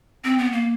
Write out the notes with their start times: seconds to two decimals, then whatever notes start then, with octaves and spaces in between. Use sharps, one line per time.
0.24 C4
0.38 B3
0.52 A#3